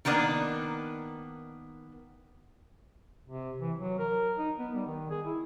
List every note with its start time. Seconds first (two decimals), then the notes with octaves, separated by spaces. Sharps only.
0.05 D#3 A#3 B3 D4 D#4
3.27 C3
3.61 E3
3.78 F#3
3.99 A#4
4.38 D#4
4.58 B3
4.75 G3
4.86 D#3
5.10 G#4
5.26 E4